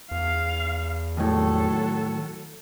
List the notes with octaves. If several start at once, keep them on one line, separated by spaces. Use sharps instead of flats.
E2 F5
D#2 A2 F#3 A4